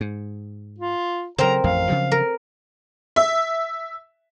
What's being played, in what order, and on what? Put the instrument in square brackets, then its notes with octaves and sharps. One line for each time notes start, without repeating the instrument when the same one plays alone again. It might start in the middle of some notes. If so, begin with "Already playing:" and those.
[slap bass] G#2
[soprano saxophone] F4
[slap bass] C#3 F#3 [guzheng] C4 A#4 [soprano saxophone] A#5
[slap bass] A1 F2 [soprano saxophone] F5
[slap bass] C#3 F3 F#3
[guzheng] A#4
[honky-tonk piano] E5